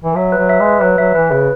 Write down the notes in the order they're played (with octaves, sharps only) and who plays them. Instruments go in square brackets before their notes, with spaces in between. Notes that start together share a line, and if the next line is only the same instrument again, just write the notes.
[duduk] E3
[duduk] F#3 [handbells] E5
[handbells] B4
[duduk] F#3
[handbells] E5
[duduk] G#3
[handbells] B4
[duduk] F#3 [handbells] B4
[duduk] F#3 [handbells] E5
[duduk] E3 [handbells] B4
[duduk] C#3 [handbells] B4